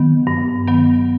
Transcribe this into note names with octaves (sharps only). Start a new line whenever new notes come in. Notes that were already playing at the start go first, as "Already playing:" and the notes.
Already playing: D#3 F#3 B3
G2
D#3 F#3 B3